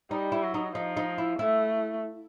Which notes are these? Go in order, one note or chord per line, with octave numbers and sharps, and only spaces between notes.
G3 D#4
E4
F#3
D#4
F3 D#4
D#4
E4
A3 E4